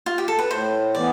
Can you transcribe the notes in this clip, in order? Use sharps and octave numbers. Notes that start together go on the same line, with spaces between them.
F4
G4
A4
B4
A2 C5
E3 B3 D5